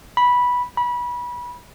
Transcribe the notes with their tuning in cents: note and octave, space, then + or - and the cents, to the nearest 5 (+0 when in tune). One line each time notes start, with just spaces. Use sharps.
B5 -10
B5 -25